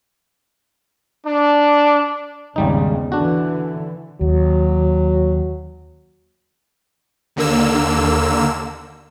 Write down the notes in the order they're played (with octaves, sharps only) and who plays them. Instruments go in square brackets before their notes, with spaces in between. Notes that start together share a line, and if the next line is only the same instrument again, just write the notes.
[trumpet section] D4
[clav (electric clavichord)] G#1 G3 D#4 [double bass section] E2 C#3
[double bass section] D3 E3 [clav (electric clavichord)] D4 F#4
[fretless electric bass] D#2 [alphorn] F#3
[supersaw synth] D#2 D3 A#3 E6